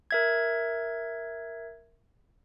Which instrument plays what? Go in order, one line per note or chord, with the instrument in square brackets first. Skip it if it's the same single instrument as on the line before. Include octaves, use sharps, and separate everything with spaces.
[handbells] A#4 E5 G#6